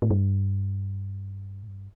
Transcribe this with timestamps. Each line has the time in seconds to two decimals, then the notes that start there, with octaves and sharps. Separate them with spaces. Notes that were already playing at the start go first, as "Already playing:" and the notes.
0.02 A2
0.11 G2
1.63 A2
1.68 G2